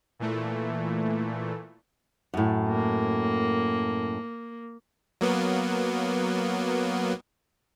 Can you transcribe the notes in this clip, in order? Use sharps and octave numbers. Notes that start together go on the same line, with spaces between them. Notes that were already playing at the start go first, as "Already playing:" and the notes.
A#2 E3 A3
F#2 A2
A#3
F#3 A#3 B3